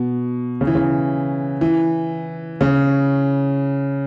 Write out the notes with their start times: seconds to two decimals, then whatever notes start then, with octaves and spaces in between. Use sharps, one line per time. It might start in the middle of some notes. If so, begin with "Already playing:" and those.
Already playing: B2
0.61 C#3
0.67 E3
0.75 C#3
1.61 E3
2.61 C#3